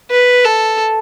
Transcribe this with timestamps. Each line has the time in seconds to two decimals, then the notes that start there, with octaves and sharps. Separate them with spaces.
0.11 B4
0.45 A4